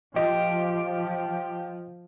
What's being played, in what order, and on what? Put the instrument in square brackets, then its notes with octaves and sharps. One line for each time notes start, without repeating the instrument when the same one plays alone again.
[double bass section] F3 [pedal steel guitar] G4 [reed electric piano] D#5